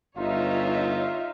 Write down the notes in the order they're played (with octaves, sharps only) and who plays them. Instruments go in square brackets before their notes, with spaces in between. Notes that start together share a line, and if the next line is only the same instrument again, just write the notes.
[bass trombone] G1 [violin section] D#4 C#5 E5 [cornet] F4